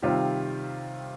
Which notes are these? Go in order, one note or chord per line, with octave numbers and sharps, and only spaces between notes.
C3 D#3 G3 C4 F4